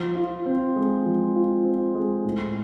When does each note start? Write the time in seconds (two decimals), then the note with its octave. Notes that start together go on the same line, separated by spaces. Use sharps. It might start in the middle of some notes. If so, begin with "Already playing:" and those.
Already playing: F3
0.16 F4
0.46 C4
0.76 G#3
1.06 F3
1.36 F4
1.65 C4
1.95 G#3
2.25 A2